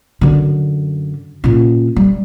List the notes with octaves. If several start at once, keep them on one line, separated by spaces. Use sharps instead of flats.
F#2 D3
A#2 C#4
G3